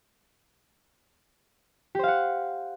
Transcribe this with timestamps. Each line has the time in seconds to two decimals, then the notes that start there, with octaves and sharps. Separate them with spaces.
1.95 G4
1.99 C5
2.03 F5
2.08 F#5